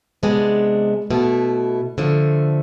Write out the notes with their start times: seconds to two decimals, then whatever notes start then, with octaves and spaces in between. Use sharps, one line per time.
0.23 C3 G#3 B3 D4
1.11 B2 A3 E4
1.98 D3 F3 A3